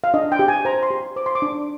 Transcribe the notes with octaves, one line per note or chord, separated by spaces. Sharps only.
F5
D4 D#5
G5
G4
G#5
C5 A#5
C6
G4
C5 D6
C6
D6
D4